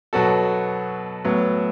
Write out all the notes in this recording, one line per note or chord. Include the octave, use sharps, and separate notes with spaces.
B2 F#3 B3 F#4 A4
A2 F#3 B3